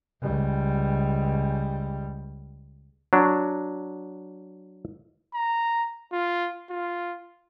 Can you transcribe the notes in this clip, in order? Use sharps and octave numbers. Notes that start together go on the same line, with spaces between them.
C#2 G3
F#3 D4
A#5
F4
F4